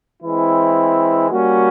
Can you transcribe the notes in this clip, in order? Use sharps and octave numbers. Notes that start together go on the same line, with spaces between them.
E3 G#3 C4 E4
G3 A#3 C#4 F#4